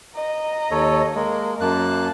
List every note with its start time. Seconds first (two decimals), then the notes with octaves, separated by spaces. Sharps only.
0.14 D#5 A#5
0.71 D#2 A4 C#5
1.15 G#3 A#3
1.61 F#2 A#3 A5 F#6